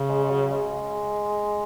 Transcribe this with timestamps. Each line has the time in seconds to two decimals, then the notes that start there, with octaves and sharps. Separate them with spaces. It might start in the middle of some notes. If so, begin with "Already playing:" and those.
Already playing: C#3
0.09 G#3
0.23 G#3
0.30 F#3
0.52 G#3